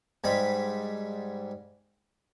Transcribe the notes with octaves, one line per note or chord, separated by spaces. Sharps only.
G#2 G3 B5